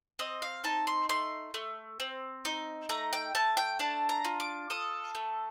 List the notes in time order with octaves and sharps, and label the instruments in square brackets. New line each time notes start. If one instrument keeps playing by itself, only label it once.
[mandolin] C4 D#5
F5
D#4 A5
C6
A3 C6
A3
C4
D#4
A3 A#5
G5
A3 A5
G5
D4 A5
A#5
F4
D6
A4 D#6
A3